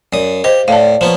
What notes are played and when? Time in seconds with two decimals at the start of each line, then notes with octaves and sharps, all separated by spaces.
0.13 F#2 D5 D#6
0.44 G4 C5 D#5 F5
0.68 A2 D5 F5 A5
1.01 F3 A#3 B3 C#5